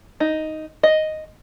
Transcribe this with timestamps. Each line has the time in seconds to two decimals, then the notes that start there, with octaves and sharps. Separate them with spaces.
0.20 D#4
0.83 D#5